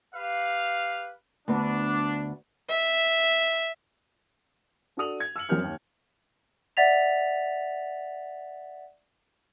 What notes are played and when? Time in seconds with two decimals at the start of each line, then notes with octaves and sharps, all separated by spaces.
0.15 G4 B4 F5
1.48 D2 B3 D4
2.70 E5
4.97 D4 F#4 A4 D#6 F7 F#7
5.20 G#6
5.36 E6 F6 C#7 F#7
5.49 F#2 F#3 C4 A#4 F6 G6
5.64 D#2
6.77 D5 E5 F#5 A6 B6 F7